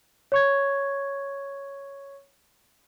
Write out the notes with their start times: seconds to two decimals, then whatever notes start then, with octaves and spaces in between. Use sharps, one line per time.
0.32 C#5 C#6 G#6